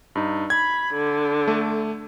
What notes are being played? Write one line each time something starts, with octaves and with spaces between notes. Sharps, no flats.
G2 D#4
B5 G#6
D3
A3